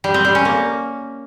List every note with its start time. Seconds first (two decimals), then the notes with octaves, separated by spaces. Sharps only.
0.04 G3
0.14 C4
0.25 G3
0.35 C#4
0.45 A#3